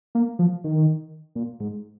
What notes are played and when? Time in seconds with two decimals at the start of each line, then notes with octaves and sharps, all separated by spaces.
0.15 A#3
0.39 F3
0.64 D#3
1.35 A#2
1.60 G#2